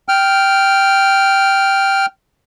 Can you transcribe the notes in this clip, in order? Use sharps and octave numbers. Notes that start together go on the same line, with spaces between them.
G5 F6